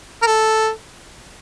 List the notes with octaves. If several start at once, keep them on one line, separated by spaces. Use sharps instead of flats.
A#4
A4